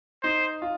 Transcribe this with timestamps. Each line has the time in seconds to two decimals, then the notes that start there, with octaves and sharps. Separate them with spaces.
0.23 D#4 C5
0.62 F4